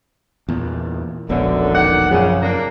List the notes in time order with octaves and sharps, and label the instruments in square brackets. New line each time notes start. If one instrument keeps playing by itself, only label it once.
[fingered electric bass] E2 A#2
[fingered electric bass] E1 A#1 B2 [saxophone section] F#2 D3
[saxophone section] D#3 D5 F#5
[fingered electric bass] F#2 F3 [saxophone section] C#3
[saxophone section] A#3 D4